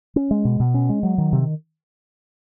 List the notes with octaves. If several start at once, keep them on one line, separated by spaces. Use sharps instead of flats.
C#4
G#3
B2
B2
C#4
G#3
F#3
D#3
C3